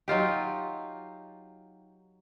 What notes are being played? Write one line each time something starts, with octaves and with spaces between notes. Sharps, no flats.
F#3 D#4 F4 G4